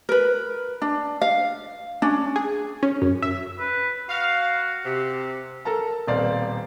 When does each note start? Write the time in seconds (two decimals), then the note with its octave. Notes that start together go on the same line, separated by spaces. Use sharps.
0.09 A#4 B4
0.82 D4
1.21 F5
2.02 C#4 D4
2.36 G#4
2.83 C#4
3.02 F#2
3.22 E5
3.60 B4
4.09 F#4 F5
4.84 C3
5.65 A4 A#4 A5 A#5
6.07 D#1 B2 C4 D5 F5